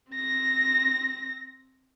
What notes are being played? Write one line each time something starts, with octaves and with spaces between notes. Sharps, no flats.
C4 A#6